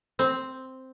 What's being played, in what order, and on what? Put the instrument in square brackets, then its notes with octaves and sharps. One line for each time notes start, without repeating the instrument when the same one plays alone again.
[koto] C4